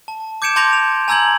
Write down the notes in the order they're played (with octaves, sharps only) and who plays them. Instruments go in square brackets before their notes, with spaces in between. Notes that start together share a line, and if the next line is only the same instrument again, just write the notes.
[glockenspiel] A5
D6 G6 G#6 C#7 D7 E7
A5 C6 D6 G6 A#6 F7
F7
G#5 A#5 E6 G6 G#6 F#7